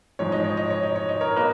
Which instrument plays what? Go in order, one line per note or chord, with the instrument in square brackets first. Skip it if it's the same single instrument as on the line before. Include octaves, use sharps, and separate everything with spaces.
[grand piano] G#2 F3 G#3 C#5
D#5
C#5
D#5
C#5
D#5
C#5
D#5
A#4 C#5
A#3 B4 D#5